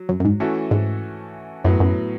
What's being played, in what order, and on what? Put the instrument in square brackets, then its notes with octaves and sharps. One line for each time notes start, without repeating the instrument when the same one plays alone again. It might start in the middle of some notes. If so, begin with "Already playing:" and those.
Already playing: [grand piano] F#3
[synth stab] F#2
F#2
G#2
[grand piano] E3 A3 C#4 F#4 A4
[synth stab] G#2
[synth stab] F#2 [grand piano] A2 F#3 B3
[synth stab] F#2